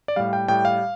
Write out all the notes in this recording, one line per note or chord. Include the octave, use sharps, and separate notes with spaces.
D5
A2 G3 F5
G5
A2 G3 G5
F5